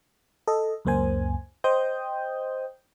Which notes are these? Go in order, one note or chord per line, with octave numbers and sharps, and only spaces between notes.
A4 D#5
C#2 F#2 A#3 C5 G#5
C5 D#5 G5 D#6 G6